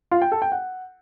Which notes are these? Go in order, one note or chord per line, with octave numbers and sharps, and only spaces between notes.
F4
G5
A4
G5
F#5